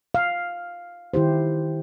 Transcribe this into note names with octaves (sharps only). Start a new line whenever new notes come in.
F5
D#3 E4 G4 C5